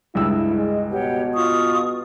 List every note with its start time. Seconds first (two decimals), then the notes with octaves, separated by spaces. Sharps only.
0.15 C#2 G2 E4 E6
0.56 G#3
0.92 B2 G4 C#5 F#5
1.34 F4 C#6 D#6